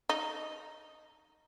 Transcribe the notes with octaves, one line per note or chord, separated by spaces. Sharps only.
D#4